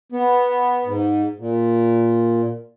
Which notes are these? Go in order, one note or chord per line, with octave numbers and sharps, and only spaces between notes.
B3
G#2
A#2